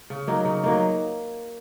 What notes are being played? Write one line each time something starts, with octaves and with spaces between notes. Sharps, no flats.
C#3
F#3 A#3 D#4
C#3
F#3 A#3 D#4